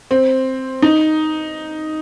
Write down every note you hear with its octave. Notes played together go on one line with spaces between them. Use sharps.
C4
D#4